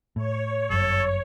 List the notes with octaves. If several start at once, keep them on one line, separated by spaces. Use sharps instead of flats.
A2 C#5
G1 F#2 A4